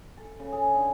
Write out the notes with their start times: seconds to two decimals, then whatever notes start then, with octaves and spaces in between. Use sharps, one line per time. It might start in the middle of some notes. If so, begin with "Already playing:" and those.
0.17 A4
0.39 C#3
0.52 G#4
0.75 D3